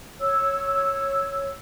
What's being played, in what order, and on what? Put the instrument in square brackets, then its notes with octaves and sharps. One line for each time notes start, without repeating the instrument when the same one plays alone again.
[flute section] C#5 E6